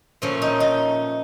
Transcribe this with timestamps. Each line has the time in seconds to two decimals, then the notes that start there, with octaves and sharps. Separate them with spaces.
0.22 A#2 F3 A3 C#4
0.42 D#4
0.60 D#4